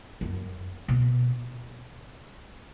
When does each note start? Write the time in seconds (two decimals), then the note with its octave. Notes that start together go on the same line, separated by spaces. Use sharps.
0.21 F#2
0.88 B2